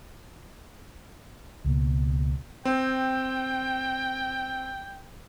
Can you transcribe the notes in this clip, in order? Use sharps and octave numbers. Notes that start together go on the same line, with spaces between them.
C#2 B2 A#3
C4 G5